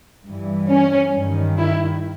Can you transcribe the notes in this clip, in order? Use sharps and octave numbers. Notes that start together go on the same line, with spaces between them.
G2 E3
C#4
G2 D#3
E4